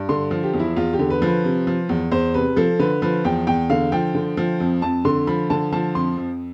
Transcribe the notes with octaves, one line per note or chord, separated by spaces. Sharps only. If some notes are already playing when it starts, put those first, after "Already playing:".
Already playing: G2
D3 C6
F3
G4
E2
E4
E2 F4
G4
D3
B4
F3
B4
C3
F3
E2
E2 C5
C3 B4
F3 A4
D3 B4
F3 B4
E2 G5
E2 G5
D3 F5
F3 G5
D3
F3
F2
F2 A5
D3 C6
F3 B5
D3 A5
F3 A5
F2 C6
F2